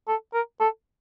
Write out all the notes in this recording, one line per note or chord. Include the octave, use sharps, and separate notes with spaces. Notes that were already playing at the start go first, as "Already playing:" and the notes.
A4
A#4
A4